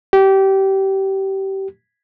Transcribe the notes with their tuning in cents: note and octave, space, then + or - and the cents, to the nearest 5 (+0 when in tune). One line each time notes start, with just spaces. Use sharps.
G4 -20